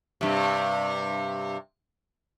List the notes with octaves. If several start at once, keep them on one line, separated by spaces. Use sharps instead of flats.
G2 C3